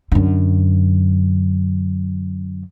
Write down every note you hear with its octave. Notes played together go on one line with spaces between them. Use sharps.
F#2 D3